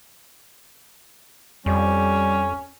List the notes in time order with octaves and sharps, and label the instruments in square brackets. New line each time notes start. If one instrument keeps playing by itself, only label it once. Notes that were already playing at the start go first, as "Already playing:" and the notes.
[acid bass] F2 [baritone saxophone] G3 [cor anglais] C#4